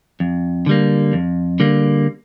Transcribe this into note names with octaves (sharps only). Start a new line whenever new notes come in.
F2
D3 G3 A#3
F2
D3 G3 A#3